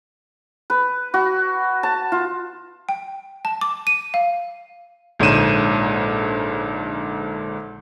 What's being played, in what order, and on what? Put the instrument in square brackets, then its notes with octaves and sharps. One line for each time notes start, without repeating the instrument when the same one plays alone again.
[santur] B4
F#4
A5
F4
[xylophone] G5
A5
D6
D#7
F5
[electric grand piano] A#1 G#2 D3 C#5 D#7 E7